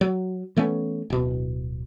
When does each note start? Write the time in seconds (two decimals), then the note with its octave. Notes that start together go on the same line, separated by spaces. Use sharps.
0.01 F#3
0.57 E3 A3 B3 C#4
1.10 D1 B2